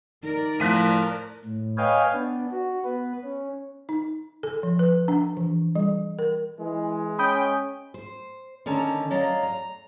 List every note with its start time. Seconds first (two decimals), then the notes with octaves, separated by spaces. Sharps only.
0.23 D#3 A#4 D5
0.60 A2 F3 F#6 B6 D#7
1.45 A2
1.77 B4 C#5 D#5 F5 G5 G#5
2.12 B3 D4
2.51 F#4
2.84 B3 B4
3.24 C#4
3.89 D#4
4.43 A4
4.63 F3
4.79 B4
5.08 D4
5.37 E3
5.75 G3
6.19 A#4
6.59 E3 G#3
7.19 C#4 G5 B5 D#6 G6
7.94 C5
8.66 D3 D#3 C#4 A5 A#5
9.10 F#3 D5 D#5 F5 A#5
9.43 A#5